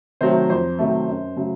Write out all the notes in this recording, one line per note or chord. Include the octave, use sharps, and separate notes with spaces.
C3 D#3 F#3 A3 C5
F2 C5
C3 D#3 F#3 A3
F#2
C#3 F#3 A3